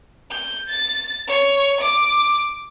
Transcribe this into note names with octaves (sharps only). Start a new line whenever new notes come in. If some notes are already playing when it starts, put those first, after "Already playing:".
G6
A6
C#5
D6